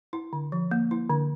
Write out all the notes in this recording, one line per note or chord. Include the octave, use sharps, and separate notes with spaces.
E4
D3
F3
A#3
E4
D3